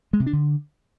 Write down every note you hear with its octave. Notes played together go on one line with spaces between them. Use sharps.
G#3
C3
D4
D3